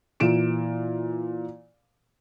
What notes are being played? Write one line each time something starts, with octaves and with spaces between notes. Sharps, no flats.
A#2 E3 D7 E7